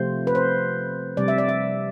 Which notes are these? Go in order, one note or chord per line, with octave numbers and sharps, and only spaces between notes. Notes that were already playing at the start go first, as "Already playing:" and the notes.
Already playing: C3 F3 A3 C5
B4
C5
C3 G3 D5
E5
D5
E5